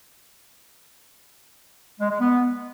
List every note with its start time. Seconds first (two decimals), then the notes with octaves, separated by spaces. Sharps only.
2.00 G#3
2.10 G#3
2.20 B3